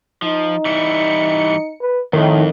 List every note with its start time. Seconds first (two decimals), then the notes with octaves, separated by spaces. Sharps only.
0.22 F3 D#4
0.65 E3 G3 E4 C#7
1.81 B4
2.13 F2 A2 D#3